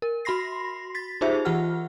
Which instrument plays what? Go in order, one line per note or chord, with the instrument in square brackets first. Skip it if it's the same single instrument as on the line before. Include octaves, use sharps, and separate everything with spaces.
[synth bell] A#4
F#4 B5 C6 A#6 C7
A6 B6
D#4 F4 G4 G#4 C5 E5
E3 F4 G4 F#5 F6